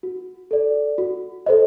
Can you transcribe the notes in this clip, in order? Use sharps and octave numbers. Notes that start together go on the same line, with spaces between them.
F#4
A4 D5
F#4
A4 C5 D#5